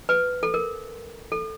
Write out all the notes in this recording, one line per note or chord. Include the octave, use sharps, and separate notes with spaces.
B4
A4
A#4
A4